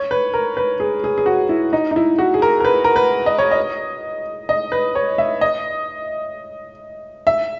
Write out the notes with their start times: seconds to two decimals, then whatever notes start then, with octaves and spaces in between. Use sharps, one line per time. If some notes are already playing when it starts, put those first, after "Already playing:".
Already playing: C#5
0.11 B4
0.34 A#4
0.57 B4
0.80 G#4
1.04 G#4
1.18 G#4
1.26 F#4
1.49 E4
1.73 D#4
1.91 D#4
1.96 E4
2.19 F#4
2.34 G#4
2.42 A#4
2.60 A#4
2.65 B4
2.84 A#4
2.96 B4
3.26 D#5
3.38 C#5
3.51 D#5
4.49 D#5
4.72 B4
4.95 C#5
5.18 E5
5.41 D#5
7.27 E5